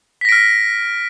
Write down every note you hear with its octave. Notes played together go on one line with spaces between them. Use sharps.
F6 A#6 B6 D7